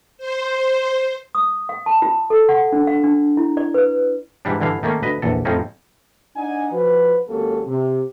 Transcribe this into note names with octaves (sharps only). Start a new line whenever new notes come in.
C5
D#6
F5
A5
F4
A4
F#5
D4
F5
D4
E4
D5
B4
G#2 E3 G3 D4
G2 D3 E3 F5
D#3 A3 A#3 C#4
D2 B4 D#5
A#1 E2 A4
F2 A2 F3 C4 C#4 D#4
D4 D#4 D5 F#5 G#5
F3 F#4 B4
G#1 F#3 A#3 C#4 G4 A4
C3